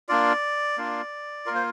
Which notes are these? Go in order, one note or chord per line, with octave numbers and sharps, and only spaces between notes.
A#3 D4 F4 D5
A#3 D4 F4
A#3 F4 A#4 C5